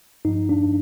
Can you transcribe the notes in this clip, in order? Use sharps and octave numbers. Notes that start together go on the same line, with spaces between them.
G2 F3 D#4
D4